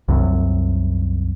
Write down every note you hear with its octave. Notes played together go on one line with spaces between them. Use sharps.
C2 F#2 C3